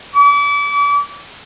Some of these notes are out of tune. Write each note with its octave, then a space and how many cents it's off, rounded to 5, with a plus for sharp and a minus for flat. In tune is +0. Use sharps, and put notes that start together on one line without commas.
D6 -35